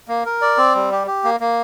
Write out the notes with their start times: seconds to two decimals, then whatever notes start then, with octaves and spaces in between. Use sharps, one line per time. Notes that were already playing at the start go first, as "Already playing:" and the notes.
0.08 A#3
0.26 A#4
0.41 D5
0.58 C4
0.75 G3
0.91 G4
1.07 G4
1.24 A#3
1.40 A#3